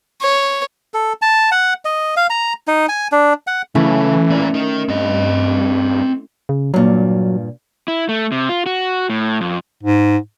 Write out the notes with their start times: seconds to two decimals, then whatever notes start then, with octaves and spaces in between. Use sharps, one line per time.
0.21 C#5
0.94 A4
1.22 A5
1.52 F#5
1.85 D#5
2.16 F5
2.30 A#5
2.68 D#4
2.89 G#5
3.12 D4
3.47 F#5
3.75 C#3 E3 A3 C#4 E4
4.30 A#3 D5
4.54 D#4 A#4
4.88 G2 C4 D#5
6.49 C#3
6.74 G2 A#2 F#3
7.88 E4
8.09 A3
8.32 C3
8.49 F4
8.66 F#4
9.10 A2
9.41 F2
9.83 G#2